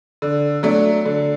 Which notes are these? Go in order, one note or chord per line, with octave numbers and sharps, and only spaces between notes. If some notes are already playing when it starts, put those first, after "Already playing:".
D3
F#3 A3 D4
D3